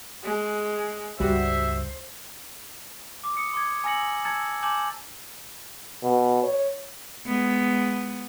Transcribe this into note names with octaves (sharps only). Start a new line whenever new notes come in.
G#3
C#2 G2 G3 F#4 C5 E5
D6
D#6 C#7
C6 D6 G#6
G#5 A#5 E6 A#6 C#7 F#7
A5 E6 G#6 A6 C#7
G#5 A5 D6 G6 F#7
B2
C#5
G#3 B3